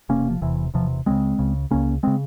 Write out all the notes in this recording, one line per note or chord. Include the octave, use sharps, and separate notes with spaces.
E1 E2 C3 A#3 C#4
F3
E1 E2 C3 E3
E1 E2 C3 F3
C#2 C#3 G#3 C4
C#2 C#3
C#2 C#3 A#3 C#4
C#3 G#3 C4